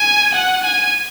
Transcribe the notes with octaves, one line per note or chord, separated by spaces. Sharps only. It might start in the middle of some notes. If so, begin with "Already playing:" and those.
Already playing: G#5
F#5
G#5